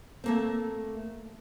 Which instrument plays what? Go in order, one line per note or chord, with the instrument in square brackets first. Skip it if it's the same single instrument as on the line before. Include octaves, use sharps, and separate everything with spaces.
[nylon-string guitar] A3 A#3 C4